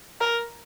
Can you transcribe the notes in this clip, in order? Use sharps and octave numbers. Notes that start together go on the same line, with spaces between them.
A#4